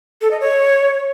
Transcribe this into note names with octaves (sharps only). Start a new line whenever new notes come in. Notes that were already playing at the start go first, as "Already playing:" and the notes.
A4
D#5
C#5